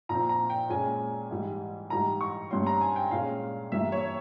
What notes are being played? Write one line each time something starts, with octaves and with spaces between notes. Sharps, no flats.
A#2 F3 C4 A#5
A#5
G5
A#2 G#3 C#4 G#5
G#2 E3 G3
G#2 E3 G3 A#5
C#6
G2 G3 C#4 C6
A#5
G#5
G5
A#2 G#3 C#4 F5
G2 E3 G3 A#3 E5
C#5